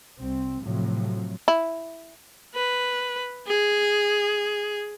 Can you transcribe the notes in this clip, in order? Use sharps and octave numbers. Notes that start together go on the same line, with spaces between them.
C2 C4
A2 C3 F3 F#3
E4
B4
G#4